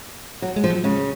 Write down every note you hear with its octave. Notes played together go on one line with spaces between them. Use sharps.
F#3
G#3
F3
F#3
C#3 G#3